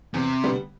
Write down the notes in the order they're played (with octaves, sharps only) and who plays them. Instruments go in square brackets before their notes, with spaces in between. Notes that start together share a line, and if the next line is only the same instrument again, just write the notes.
[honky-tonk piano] E2 [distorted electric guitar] C3
[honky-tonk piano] D3 G3 B3